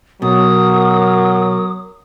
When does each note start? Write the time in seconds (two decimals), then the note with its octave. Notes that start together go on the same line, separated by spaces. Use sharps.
0.22 B2 F#3 A#4 D#6